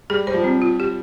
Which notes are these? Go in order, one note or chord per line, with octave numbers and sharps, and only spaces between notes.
G3 G#4
G3 C5
F3
G3 C4
F4
G4